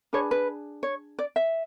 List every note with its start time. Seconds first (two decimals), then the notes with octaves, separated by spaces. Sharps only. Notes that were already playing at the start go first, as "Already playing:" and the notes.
0.13 D4 G#4 B4 C#5
0.31 B4
0.83 C#5
1.19 D5
1.36 E5